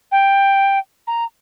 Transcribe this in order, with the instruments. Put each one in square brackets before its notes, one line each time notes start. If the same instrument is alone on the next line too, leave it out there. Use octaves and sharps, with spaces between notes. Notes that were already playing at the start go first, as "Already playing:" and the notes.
[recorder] G5
A#5